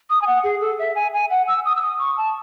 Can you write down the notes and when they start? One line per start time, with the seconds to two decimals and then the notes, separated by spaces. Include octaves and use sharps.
0.10 D#6
0.22 G#5
0.27 F#5
0.44 G#4
0.61 A4
0.79 E5
0.96 G#5
1.14 G#5
1.30 F#5
1.48 E6
1.65 D#6
1.76 E6
1.82 D#6
1.99 C#6
2.17 A5